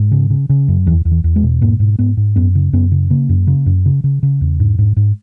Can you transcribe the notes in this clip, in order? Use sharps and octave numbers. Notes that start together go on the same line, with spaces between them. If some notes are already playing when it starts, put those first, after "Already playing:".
Already playing: G#2
C#3
C#3
C#3
F#2
E2 E3
E2
E3
E2
G#3
B2
G#2 A#3
G#2
G#2 B3
G#2
F#2 B3
C#3
F#2 B3
C#3
C#3 A#3
F#2
C#3
F#2
C#3
C#3
C#3
E2
G#2
G#2
G#2